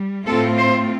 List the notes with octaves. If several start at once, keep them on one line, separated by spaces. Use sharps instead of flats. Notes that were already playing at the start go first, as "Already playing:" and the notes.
Already playing: G3
A2 A3 C4 F4 A4
C5